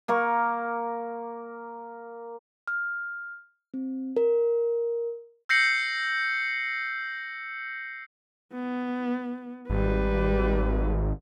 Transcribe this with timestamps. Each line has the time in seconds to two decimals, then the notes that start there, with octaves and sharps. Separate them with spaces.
0.08 A#3 A#4 C#6
2.68 F6
3.74 C4
4.17 A#4
5.49 E6 G6 A#6 C7 C#7 F#7
8.53 B3
9.70 G#1 G3 B4